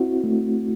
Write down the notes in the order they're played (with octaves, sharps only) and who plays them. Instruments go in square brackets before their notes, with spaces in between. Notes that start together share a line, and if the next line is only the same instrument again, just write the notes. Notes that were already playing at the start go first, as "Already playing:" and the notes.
Already playing: [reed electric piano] C4 E4 F#4
A3